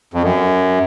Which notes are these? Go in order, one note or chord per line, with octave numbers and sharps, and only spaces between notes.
F2
F#2